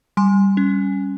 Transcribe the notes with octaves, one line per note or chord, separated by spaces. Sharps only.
G3 G#5 C6
C#4